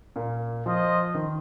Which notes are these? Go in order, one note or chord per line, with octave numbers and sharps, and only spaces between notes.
A#2 A#3
F3 F4 C5 D#5
D#3